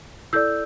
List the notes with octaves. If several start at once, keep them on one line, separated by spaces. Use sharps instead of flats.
E4 A4 D5 E6 G6